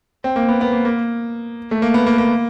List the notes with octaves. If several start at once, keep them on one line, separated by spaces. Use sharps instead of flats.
C4
A#3
B3
B3
A#3
A#3
A3
A#3
B3
A#3
A#3